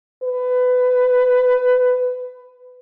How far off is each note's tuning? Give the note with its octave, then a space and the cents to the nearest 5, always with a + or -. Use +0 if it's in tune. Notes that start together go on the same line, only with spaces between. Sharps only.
B4 +20